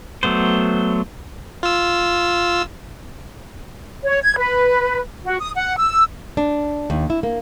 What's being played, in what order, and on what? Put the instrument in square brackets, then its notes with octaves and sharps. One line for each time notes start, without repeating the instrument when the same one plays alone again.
[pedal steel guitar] F#3 A3 B3 C5
[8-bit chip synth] F4 E6
[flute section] C#5
G#6
B4
F#4
D#6
F#5
E6
[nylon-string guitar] D4
D#2
E4
A#3